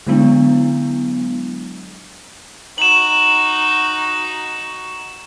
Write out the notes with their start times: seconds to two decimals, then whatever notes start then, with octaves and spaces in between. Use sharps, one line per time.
0.07 D3 F#3 G#3 B3 D4 E4
2.78 D#4 F#4 E7 F#7